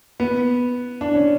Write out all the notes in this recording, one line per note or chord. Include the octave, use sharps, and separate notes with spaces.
B3
D4
C#4